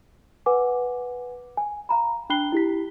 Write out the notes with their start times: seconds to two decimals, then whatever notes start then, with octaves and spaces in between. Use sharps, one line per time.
0.46 B4 F#5 G#5 D6
1.57 G#5
1.89 F5 A#5 B5
2.30 D4 G5 B5 F#6 C7 G7
2.52 E4 G4 B6